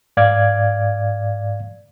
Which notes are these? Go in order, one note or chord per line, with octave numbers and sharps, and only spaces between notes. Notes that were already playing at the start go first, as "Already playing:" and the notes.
G#2 D5 F5 G#6